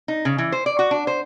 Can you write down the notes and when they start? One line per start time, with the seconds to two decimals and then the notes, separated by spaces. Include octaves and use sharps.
0.08 D#4
0.25 C#3
0.38 E3
0.52 C5
0.66 D5
0.79 F#4
0.91 D4
1.07 C5